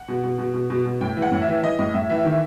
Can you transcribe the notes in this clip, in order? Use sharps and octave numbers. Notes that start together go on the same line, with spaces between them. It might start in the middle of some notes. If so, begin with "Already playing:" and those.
Already playing: F#5
B2
B2
B2
B2
B2
B2
A2 G5
E3
F#5
A2
E5
E3
E3 D#5
A2 D#5
A2 E5
E3 E5
D#3